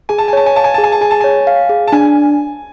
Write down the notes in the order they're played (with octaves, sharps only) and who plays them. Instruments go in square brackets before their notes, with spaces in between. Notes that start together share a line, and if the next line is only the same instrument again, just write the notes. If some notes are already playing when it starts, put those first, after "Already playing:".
[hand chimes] G#4 [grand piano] G#5
[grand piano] A5
G#5
[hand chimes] C#5 [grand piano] A5
[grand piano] G#5
[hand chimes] F5 [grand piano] A5
[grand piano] G#5
[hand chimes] G#4 [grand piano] A5
[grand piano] G#5
A5
[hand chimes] G#4 [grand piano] G#5
[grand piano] A5
[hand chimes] C#5 [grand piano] G#5
[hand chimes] F5
G#4
[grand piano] A5
[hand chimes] D4 [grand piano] G#5